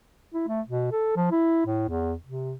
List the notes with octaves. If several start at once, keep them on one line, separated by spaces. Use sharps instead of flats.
E4
A3
B2
A4
F3
E4
A2
E2
C3